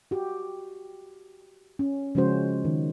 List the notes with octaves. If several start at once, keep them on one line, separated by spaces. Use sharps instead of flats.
F#4 G4
C#4
C#3 F3 G#3 C#4 F#4 C5
D#3